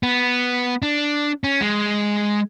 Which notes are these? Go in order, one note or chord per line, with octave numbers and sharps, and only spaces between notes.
B3
D4
C#4
G#3